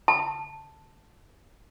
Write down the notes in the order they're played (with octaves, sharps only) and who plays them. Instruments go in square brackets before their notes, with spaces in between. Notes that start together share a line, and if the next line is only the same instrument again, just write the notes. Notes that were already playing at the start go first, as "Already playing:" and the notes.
[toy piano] A5